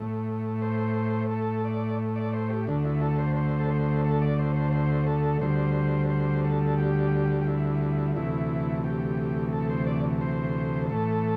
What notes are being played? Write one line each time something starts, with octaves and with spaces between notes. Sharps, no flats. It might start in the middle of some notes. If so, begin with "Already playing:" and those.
Already playing: A2 A3
C5
A4
D5
D5
C5
G4
D2 D3 A3 D4
E4
A4
C5
C5
A4
C5
A4
D5
C5
C5
C5
A4
D2 D3 G3 C5
C5
A4
G4
G4
E4
D2 C3 E3 A3 E4
G4
A4
C5
D5
C5
A2 E3 A3 A4